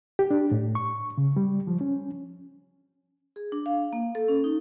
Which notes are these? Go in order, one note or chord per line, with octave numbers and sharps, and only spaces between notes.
G4
D4
A2
C#6
C#3
G3
F3
C#4
G#4
D4
F5
A#3
A4
C#4
D#4